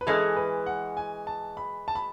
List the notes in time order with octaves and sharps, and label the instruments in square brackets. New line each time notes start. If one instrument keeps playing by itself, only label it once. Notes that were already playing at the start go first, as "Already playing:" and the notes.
[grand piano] B4
[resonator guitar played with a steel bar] E3 G#3 C#4 [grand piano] A4
[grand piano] B4
F#5
G#5
A5
B5
A5
B5